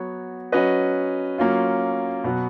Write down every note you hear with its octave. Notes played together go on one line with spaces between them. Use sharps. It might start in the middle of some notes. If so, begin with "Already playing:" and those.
Already playing: F#3 B3 F#4 C#5
F#3 C#4 F#4 B4 D#5
F#3 A#3 C#4 F4
B2 F#3 B3 F#4